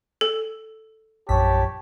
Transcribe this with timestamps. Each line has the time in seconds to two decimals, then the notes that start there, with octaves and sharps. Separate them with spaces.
0.21 A4
1.29 A#1 F#2 G4 C#5 A5 B6